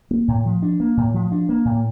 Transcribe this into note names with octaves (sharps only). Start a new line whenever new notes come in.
A#3
A2
F3
D4
A#3
A2
F3
D4
A#3
A2